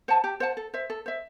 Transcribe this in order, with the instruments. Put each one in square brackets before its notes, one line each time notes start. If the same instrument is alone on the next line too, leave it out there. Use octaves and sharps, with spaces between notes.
[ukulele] C5 F#5 A5
G4
C5 F#5 A5
A4
C5 E5
A4
C5 E5